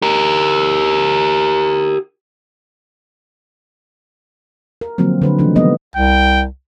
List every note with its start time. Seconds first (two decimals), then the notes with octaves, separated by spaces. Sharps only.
0.02 G4 A#4
4.81 A#4
4.98 D3 F3 F#3 A#3 C4
5.22 D3 B4 C5
5.38 C3 D#3 F3 A3 D4 D#4
5.55 E3 F3 G3 A#3 B3 D#5
5.96 C2 G5